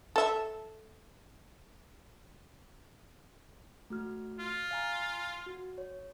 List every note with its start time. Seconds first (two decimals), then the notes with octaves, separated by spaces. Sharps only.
0.16 A4 E5
3.90 A3 F#4 F6
4.39 F4
4.71 F5 G#5 A#5
5.46 F#4
5.78 C#5